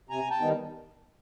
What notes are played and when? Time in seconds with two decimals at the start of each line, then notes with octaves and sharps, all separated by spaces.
0.09 C3 G#5 A#5
0.30 G5 A5
0.41 D#3 G3 B3 D#4